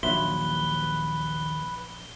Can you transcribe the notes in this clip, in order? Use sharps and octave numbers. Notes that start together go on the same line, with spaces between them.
A#1 D#2 F#3 B4 E5 C6 G7